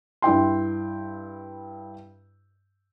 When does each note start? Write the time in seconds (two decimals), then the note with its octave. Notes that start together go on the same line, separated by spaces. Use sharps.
0.22 G2 E4 G5 C6